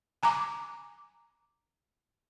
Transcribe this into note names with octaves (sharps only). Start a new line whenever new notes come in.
G#5 A#5 B5 D6